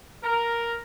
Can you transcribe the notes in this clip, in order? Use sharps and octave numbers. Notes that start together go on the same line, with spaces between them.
A#4